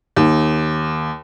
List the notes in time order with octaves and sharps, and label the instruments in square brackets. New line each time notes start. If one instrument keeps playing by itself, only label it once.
[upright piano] D#2